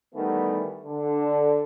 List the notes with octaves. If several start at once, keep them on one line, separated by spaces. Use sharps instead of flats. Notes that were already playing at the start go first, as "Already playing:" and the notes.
D#3 E3 G3 A3 B3
D3